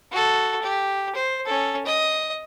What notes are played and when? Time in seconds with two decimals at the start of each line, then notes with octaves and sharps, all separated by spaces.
0.12 F#4 A4
0.62 G4
1.16 C5
1.45 C#4 A4
1.86 D#5